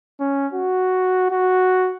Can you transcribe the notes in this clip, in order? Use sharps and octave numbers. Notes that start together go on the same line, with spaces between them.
C#4
F#4
F#4